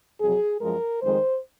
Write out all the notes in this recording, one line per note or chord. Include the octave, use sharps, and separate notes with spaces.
F2 C3 F#3 G#4
F#2 F3 G#3 A#4
F2 D#3 G#3 C5